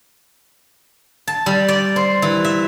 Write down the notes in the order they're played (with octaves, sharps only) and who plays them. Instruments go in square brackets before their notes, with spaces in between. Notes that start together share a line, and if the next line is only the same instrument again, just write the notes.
[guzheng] A5
G3
D5
C5
E3
E5